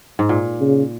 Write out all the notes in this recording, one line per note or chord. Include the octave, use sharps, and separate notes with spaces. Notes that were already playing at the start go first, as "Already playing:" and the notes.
G#2
A#2
C#3